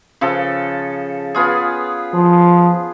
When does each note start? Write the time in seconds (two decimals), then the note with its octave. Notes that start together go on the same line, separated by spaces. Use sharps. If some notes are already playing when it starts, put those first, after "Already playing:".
0.21 C#3 F3 A4
1.34 B3 F4 G#4
2.14 F3